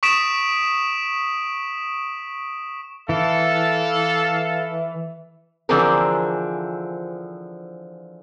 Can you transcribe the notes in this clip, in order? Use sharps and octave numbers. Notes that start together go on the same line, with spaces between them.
C#6 D#6 B6 D7 E7
E3 A4 F5
D3 E3 F3 C4 G#4 A#4